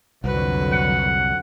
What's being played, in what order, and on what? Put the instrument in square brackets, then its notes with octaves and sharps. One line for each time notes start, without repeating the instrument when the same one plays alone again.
[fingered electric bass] C2 [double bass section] F2 D3 F#3 [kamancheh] F#4 B4
[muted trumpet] F#5